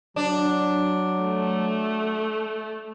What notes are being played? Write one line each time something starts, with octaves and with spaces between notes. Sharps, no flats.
F#3 D4
A3